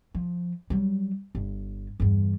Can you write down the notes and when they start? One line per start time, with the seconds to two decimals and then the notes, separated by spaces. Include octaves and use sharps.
0.15 F3
0.70 F#3 G3
1.35 G1
2.00 E2 G2